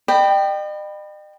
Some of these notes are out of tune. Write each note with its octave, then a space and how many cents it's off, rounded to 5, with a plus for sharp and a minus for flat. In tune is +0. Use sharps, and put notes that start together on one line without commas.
D#5 -45 G5 +0 B5 +0